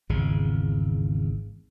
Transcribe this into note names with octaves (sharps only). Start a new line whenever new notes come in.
G#1 E2 C#3